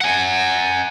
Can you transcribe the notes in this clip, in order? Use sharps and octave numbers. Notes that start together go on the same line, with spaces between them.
F#5 G#5